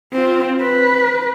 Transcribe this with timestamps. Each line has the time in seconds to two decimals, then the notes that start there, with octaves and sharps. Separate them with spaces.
0.13 C4 F4
0.61 B4